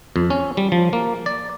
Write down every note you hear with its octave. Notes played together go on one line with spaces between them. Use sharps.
F2
C#4
G3
F3
A#3
D5